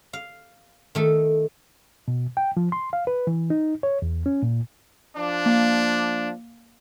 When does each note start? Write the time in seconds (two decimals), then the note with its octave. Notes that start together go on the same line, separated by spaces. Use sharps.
0.13 F5
0.95 D#3 A3 A4
2.08 B2
2.37 G5
2.57 F3
2.72 C6
2.93 F5
3.07 B4
3.27 E3
3.50 D#4
3.83 C#5
4.02 E2
4.26 C#4
4.43 A#2
5.17 F3 D4
5.46 A#3 F5